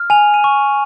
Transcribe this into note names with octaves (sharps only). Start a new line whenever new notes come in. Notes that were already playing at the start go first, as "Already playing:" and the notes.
Already playing: F6
G#5 F7
D#7
C#6